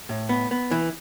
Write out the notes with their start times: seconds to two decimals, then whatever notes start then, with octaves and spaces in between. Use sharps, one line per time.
0.09 A2
0.29 B3
0.51 B3
0.71 E3